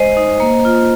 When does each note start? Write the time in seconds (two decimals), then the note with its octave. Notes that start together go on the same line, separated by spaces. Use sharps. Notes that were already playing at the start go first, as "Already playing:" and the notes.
Already playing: G#3 C5 D#5
0.17 D#4
0.40 A#3
0.65 F4